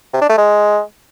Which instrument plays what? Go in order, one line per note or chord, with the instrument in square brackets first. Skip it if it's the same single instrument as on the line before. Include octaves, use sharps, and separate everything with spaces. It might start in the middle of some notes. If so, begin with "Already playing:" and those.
[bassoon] C3
D4
A3
G#3